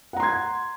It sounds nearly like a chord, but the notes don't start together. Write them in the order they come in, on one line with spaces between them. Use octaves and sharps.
F#5 A#5 C6 G#6